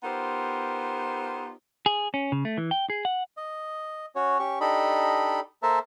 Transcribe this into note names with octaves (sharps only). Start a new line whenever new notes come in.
B3 D#4 F4 G4 A#4 C5
G#4
C#4
C#3
A3
E3
G5
G#4
F#5
D#5
C#4 F#4 C#5
C#4 G4 C#6
D4 D#4 G4 A4 D#5 B5
A#3 A4 A#4 C5 E5 A5